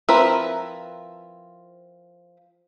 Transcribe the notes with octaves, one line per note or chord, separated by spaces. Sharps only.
F3 C4 E4 A#4 B4